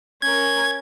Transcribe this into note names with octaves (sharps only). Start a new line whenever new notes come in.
C#4 A#4 G#6